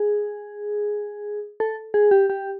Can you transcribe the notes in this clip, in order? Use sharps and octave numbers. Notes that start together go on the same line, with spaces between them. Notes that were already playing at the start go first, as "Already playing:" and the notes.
Already playing: G#4
A4
G#4
G4
G4